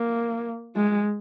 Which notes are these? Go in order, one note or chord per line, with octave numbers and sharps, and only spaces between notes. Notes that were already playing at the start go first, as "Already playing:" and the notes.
Already playing: A#3
G#3